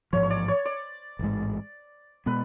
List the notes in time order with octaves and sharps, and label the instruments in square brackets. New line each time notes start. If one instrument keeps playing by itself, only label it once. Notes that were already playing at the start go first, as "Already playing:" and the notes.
[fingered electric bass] A1 G#2 F3 [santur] C#5
[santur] C#5
D5
C#5
D5
[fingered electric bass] A1 G#2 G#3
[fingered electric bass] B2 G#3 B3 [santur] B4